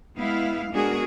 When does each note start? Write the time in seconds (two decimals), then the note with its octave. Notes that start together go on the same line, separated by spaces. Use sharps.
0.18 G#3 B3 E4 F5
0.71 G#3 B3 D4 F#4 G#4 A#4